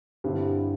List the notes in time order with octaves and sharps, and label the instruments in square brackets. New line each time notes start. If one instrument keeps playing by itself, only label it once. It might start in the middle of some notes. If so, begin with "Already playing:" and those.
[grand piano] G2 D3 G3 C4 E4